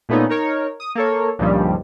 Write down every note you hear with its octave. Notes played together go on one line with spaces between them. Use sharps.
A#2 A3 B3 C#4 D#4
D#4 A#4 C#5
D#6
A#3 A4 C#5
C#2 G2 A#2 D#3 F3 G3